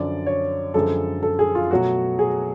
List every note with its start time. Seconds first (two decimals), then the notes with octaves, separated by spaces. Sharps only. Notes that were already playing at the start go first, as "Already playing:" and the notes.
Already playing: F#2 D3 F3 D5
0.26 C#5
0.74 F#2 D3 F3 G#3 A4
1.23 A4
1.39 G#4
1.55 F4
1.71 B2 F#3 A3 F#4
2.19 G#4